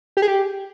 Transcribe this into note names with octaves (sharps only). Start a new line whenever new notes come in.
G4
G#4
G4